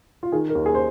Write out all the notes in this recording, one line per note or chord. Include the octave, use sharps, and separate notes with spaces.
F4
D#3 G#4
A#4
D#2
G#4
C5